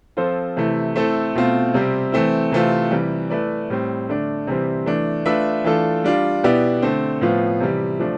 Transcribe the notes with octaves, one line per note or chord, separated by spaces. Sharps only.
F3 C4 F4 A4 C5
C3 E3 A3 E4
A3 C4 E4 A4
B2 A3 C4 F4
C3 G3 C4
E3 A3 C4 E4
C3 E3 A3 C4 F4
C3 E3 G3
A3 E4 B4 D5
A2 G3 C4
D3 A3 D4
C3 E3 G3 C4
E3 A3 D4
A3 D4 F4 B4 E5
E3 A3 D4 F4 A4
G3 D4 F4
B2 B3 E4 G4 D5
D3 A3 C4
A2 F3 B3 F4
C3 E3 G3
F3 A3 D4